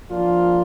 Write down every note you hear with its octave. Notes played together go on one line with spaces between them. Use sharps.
F3 A#3 D4 F4